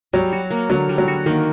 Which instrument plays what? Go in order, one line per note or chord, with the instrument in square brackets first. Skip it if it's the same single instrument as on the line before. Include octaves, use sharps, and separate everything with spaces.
[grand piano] F#3 [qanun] G3
[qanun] F#4
A#3
[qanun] D3 [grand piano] F#3
[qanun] G3
[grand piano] F#3
[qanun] F#4
[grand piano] D#3 [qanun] A#3